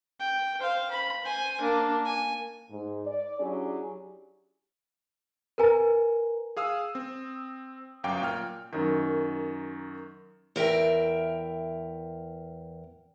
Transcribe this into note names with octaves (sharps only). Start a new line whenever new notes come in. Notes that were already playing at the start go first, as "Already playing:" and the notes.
G5
C5 F5
B5
C5 G#5
A#3 D4
G#5
G#2
D5
F#3 C#4 D4 E4 G4 G#4
A#4 B4 G#5 A#5
G#4 F5 D#6 E6
C4
G1 F#2 F5 G5 D6
A#2 G5 F6
F#2 D#3
E2 A#4 E5 G5